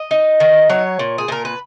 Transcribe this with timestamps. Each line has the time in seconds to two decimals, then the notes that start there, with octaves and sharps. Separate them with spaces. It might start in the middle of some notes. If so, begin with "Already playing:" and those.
Already playing: D#5
0.11 D#4
0.40 D#3
0.70 F#3 C#5
0.99 A#2
1.18 G#4
1.28 A#2 A#4
1.45 B4